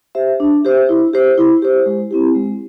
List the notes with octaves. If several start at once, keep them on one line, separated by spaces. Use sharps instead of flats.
G4 C5 E5
D4
G4 C5 E5
E4
G4 C5
E4
G4 C5
G#3
C4 E4 G4
G#3